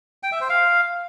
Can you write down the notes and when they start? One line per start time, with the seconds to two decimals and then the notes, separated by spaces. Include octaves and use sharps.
0.23 G5
0.32 E5
0.41 C5
0.50 F5